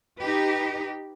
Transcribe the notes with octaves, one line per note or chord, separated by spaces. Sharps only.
D#4 G4 B4